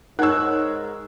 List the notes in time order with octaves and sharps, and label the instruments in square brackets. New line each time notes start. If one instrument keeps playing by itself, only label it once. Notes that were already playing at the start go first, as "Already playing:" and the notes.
[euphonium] G#2 [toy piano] D#4 F#5 [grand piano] A#4 C#5 [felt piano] E6 F#6